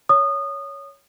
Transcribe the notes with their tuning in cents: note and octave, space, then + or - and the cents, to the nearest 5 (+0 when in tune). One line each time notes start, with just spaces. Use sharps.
C#5 +10 D#6 -25